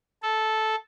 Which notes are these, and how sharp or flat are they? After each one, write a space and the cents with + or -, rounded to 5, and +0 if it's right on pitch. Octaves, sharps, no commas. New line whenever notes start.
A4 -10